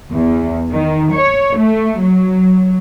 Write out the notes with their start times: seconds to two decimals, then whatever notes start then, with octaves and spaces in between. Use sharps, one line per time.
0.12 E2
0.71 D#3
1.14 C#5
1.58 A3
2.02 F#3